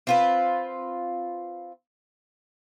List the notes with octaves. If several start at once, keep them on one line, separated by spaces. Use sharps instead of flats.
C4 F4 B4